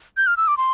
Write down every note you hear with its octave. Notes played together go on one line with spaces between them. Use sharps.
G6
F6
E6
D6
C6